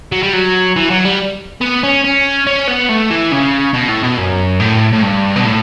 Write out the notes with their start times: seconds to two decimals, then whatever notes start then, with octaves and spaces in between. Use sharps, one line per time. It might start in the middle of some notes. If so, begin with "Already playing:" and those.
0.12 F#3
0.23 G3
0.33 F#3
0.76 E3
0.90 F#3
1.05 G3
1.61 B3
1.83 C#4
2.04 C#4
2.47 C#4
2.68 B3
2.89 A3
3.10 E3
3.32 C#3
3.74 B2
3.88 A2
4.03 B2
4.18 F#2
4.60 A2
4.93 A2
5.02 G2
5.36 B2
5.45 A2